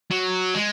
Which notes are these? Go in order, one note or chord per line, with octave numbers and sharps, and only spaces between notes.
F#3
G#3